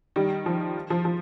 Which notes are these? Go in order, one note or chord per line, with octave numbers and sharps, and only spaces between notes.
D#3 G3
F3
F3
F3